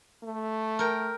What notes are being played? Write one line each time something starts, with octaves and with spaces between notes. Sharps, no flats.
A3
A#4 G5